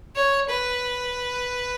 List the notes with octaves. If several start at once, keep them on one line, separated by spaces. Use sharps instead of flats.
C#5
B4